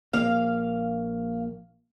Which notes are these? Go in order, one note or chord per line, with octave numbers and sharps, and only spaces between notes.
A#1 A#3 F5